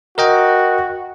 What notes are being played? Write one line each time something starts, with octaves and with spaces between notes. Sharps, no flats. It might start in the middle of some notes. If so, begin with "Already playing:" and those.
F#4 A#4 D#5 G5